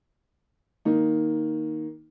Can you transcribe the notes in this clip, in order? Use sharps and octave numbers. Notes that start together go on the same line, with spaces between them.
D#3 A#3 D#4